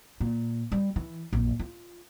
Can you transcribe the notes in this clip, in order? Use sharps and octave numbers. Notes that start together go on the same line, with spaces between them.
A#2
G3
E3
A#1 F#2
F4